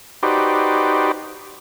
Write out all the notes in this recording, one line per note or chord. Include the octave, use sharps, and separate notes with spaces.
D#4 F#4 G4 B4 C5 D5